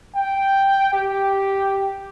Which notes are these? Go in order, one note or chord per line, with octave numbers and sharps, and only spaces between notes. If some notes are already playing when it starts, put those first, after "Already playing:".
G5
G4